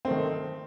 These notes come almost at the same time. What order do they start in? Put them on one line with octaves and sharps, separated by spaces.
C4 A3 D#3